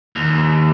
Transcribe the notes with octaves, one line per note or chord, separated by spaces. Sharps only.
D#2